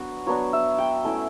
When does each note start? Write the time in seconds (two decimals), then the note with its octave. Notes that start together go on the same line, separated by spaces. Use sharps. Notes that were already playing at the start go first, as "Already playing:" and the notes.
Already playing: F#3 B3 D4 F#4
0.27 F#3 B3 D4 C#5
0.53 E5
0.78 G5
1.04 A3 C#4 E4